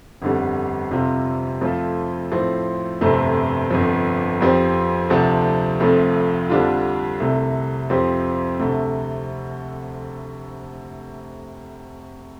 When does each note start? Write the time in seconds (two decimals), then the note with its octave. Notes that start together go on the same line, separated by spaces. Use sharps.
0.22 G1 F2 D3 G3
0.91 F2 C3 G3 F4
1.61 F2 F3 A3 F4 A4
2.31 A2 F3 C4
3.01 G1 F2 C3 A3 C4
3.71 G1 F2 F3
4.40 F2 F3 C4 G4
5.10 D2 C3 F3 D4 A4
5.80 F1 F2 F3 A3
6.49 F2 D3 G3 D4 F4
7.20 C2 C3 A3
7.90 F2 F3 C4 G4
8.59 D2 C3 A3